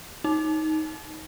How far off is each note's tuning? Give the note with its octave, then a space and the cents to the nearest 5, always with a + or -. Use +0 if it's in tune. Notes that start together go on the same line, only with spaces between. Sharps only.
D#4 +10